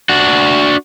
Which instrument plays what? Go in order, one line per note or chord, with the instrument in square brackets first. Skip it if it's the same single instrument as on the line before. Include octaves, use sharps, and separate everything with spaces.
[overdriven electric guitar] D4 F#4